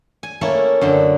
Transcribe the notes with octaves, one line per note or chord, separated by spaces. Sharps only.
G#5
A3 A#3 C#4 E4 A4
F#2 D3 G5